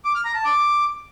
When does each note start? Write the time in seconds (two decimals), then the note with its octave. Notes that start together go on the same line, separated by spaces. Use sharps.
0.05 D6
0.15 F6
0.25 A#5
0.35 A5
0.44 D6